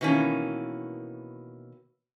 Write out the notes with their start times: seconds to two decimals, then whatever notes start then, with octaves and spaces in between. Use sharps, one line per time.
0.01 B2 D#3 E3 A#3 C#4